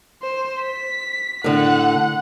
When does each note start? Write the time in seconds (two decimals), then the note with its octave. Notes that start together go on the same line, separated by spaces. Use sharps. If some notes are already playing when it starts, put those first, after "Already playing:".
0.22 C5
0.63 B6
1.44 A2 D3 F#5